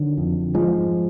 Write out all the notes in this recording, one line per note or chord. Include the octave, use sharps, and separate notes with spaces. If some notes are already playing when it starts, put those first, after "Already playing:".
Already playing: D3 D#3 F#3
F2
G#2 F3 G#3